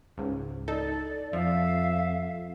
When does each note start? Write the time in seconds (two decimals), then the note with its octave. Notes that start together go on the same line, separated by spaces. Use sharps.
0.18 C#2 G#2
0.68 D#4 A4 D5
1.33 F2 F3 E5 F5